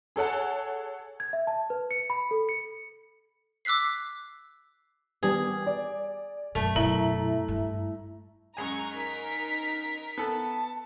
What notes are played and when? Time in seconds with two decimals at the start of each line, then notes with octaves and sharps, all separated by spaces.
0.16 G#4 A4 C#5 F#5 A5
1.20 G#6
1.33 E5
1.47 A5
1.70 B4
1.91 C#7
2.10 B5
2.31 A4
2.49 C#7
3.65 D6 E6 F#6 B6 C7
5.23 G3 B3 G#4
5.66 D5
6.55 F#2 B2 A3
6.76 F#2 B2 E4 A#5 F#7
7.48 G2
8.57 F#2 G#3 G#5 A#5 C#6
8.94 D#4 A#4 B6
10.18 B3 A4 A5